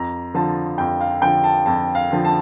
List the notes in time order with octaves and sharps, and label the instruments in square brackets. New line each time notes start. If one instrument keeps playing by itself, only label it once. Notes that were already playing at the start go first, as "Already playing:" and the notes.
Already playing: [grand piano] F2 A#5
D3 F3 A5
F2 G5
F5
D3 F3 G5
A5
F2 A5
F5
D3 F3
A5